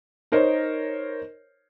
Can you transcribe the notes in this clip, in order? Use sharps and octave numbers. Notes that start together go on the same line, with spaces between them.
D#4 A#4 C5 C#5